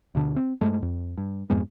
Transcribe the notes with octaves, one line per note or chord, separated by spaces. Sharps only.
D2 B2 D3 D4
C4
G2 G#3 A3
F2
G2
F2 G#2 G#3 B3